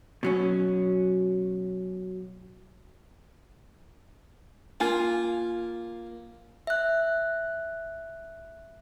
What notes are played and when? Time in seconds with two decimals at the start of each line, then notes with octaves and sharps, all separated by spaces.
0.23 B2 F#3 C#4
4.80 A#3 F4 G#5
6.67 E5 F#6